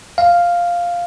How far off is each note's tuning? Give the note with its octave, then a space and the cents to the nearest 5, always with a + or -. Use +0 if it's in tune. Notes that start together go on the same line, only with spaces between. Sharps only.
F5 +0